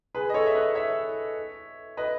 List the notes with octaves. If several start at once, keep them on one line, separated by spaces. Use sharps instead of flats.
G#4 B4
D#5
A4 C#5
E5
B4 D#5
C#5 E5
B4 D#5